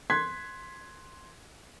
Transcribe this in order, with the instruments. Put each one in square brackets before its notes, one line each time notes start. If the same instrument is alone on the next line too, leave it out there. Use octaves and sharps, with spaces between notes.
[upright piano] C6 F#6 G#6 B6